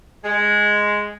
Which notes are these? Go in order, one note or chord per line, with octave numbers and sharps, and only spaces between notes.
G#3